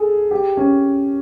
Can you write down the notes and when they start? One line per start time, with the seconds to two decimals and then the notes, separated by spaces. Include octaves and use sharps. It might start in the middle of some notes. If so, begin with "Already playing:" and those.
Already playing: G#4 A4
0.31 G4
0.57 C#4